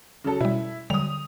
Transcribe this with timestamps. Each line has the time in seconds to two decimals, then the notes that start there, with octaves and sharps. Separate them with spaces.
0.24 C#3 F#3 A4
0.41 B2 G3 E4
0.90 D3 F#3 G3 D#6 F7